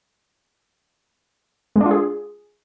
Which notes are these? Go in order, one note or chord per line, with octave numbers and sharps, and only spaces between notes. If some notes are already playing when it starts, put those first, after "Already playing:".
G#3
D4
F4
G#4